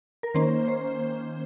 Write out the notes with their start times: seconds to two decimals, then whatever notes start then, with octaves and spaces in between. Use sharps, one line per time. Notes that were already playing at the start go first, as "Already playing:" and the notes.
0.23 A#4
0.34 D#3 A#3 C#4 C5
0.68 C5